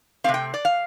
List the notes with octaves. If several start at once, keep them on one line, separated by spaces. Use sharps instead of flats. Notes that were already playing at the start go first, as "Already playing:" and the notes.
C3 A3 C4 F5
G5
D5
F5